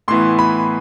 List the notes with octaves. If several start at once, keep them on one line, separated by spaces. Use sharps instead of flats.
A2 E3 B3 C6
B5